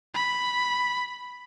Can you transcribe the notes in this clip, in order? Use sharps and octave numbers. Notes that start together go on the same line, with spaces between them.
B5